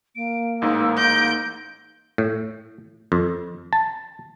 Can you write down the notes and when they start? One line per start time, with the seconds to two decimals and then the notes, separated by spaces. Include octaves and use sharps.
0.16 A#3 D7
0.62 A1 G#2 D#4 E6
0.97 G6 A#6 D7
2.18 A2
3.12 F2
3.73 A5